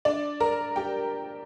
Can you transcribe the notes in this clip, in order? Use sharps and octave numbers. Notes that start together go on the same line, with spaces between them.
D4 D5
A#4 A#5
G4 G5